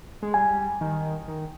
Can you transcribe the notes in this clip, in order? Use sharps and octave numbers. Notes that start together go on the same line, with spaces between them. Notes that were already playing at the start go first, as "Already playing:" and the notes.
G#3
G3 G#5
D#3
D#3